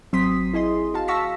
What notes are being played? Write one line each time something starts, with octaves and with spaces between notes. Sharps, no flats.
G#1 F#3 C4 C6 D#6 B6
E4 G#4 D#5 C6
F#4 F5 A5
F5 A5 C#6 E6 A#6 B6